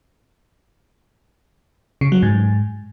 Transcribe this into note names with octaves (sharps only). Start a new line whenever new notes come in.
C#3
F#3
G#2